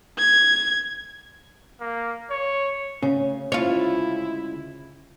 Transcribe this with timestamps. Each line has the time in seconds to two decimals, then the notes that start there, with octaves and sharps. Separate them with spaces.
0.19 G#6
1.80 A#3
2.30 C#5
3.02 D2 C#3 C#4
3.52 G#3 E4 F4 C#5